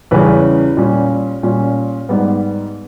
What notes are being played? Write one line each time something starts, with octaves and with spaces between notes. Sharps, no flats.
E2 C#3 G3 C#4 B4
A#2 G3 C#4
A#2 G3 C#4
G#2 G3 B3